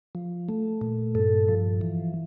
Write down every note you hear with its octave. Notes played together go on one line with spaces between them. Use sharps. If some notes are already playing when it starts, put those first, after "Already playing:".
F3
A3
A#2
G2 A4
F3
E3